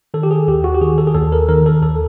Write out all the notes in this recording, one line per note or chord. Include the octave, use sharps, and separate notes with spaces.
D#3 A4
G4
G#4
D#2 G4
F#4
G4
D#3 G#4
A4
G#4
D#2 A4
A#4
D#3 A#4
A4
D#2 A4